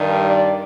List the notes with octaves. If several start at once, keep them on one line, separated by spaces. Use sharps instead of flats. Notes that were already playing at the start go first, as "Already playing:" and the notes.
Already playing: G2 D#3 G3
D5